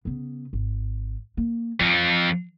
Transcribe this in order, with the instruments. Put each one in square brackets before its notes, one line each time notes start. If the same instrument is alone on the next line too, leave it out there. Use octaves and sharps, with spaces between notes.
[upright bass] C#3 B3
G#1
A#3
[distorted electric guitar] F2 F3 [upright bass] E3